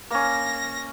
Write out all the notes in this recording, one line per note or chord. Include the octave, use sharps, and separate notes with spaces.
A#3 C#4 A#6